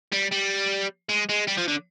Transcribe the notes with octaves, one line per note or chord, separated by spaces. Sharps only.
G3
G3
G#3
G#3
G3
F3
D3